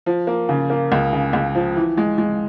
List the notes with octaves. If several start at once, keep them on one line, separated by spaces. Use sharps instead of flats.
F3
A#3
C#3
A#3
C#2
C#3
C#2
F3
E3
G#3
G#3